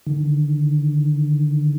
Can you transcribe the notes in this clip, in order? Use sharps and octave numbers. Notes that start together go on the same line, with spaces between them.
D3 D#3